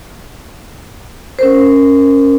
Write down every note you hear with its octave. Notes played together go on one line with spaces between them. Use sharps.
C#4 A#4 C5